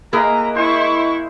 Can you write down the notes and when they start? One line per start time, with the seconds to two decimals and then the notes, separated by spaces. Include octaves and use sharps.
0.13 A#3 E4 G#4 B4 D#5 A#5
0.56 G#3 E4 C5 C#6